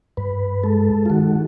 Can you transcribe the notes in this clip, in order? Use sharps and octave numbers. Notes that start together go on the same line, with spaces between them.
G2 B4
G#3 A4
F4
D#3 F#4